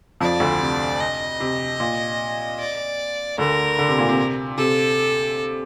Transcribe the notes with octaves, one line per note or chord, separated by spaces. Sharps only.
F2 F3 D5
D2 D3
C3
D#5
C3
A#2
D5
D2 D3 A#4
D3
C3
A#2
C3
C3 A4